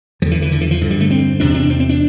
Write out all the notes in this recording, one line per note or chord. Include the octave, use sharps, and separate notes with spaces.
E2 D3 F3
E3
E3
D3
E3
F3
G2 D3
G3
A3
C4
E2 C3 D4
D4
C4
C4
D4